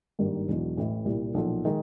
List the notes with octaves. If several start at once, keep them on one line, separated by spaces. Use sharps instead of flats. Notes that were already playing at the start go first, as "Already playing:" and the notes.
G#1 G2 D#3 G3 A#3
E1 E2 B2 F#3
A1 A2 E3
C2 A#2 G3
B1 A#2 F3
D#3 G#3